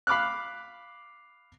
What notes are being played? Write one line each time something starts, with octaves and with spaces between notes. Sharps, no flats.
F5 B5 D6 F6 F#6